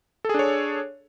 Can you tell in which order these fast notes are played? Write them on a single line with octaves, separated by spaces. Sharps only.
A4 G#4 D4 C#5